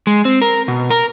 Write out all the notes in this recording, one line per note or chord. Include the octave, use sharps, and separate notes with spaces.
G#3
C4
A#4
B2
A#4